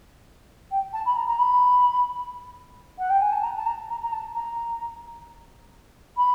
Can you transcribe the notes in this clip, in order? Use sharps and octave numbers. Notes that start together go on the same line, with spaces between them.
G5
A5
B5
A#5
A#5
B5
F#5
G5
G#5
A5
A#5
A5
A#5
A#5
A#5
A5
A#5
B5